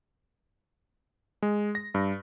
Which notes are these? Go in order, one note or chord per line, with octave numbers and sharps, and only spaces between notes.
G#3
A#6
G2